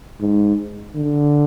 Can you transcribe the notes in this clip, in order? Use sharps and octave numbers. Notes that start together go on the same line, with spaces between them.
G#2
D3